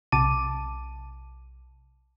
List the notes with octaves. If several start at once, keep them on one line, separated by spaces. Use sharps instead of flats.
B1 C3 A5 D6 D#7